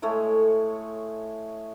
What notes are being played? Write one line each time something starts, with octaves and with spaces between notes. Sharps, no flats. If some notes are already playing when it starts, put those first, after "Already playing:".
A2 G#3 A3 C#5